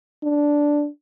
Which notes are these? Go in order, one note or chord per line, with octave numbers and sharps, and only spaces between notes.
D4